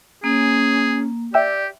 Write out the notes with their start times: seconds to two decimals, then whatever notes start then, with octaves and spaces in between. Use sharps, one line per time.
0.24 A#3 C#4 G#4
1.34 G4 D5 E5 G5 E6